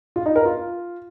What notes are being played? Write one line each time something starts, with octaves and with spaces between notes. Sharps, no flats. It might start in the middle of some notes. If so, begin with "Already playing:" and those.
F4
D#4
A#4
F4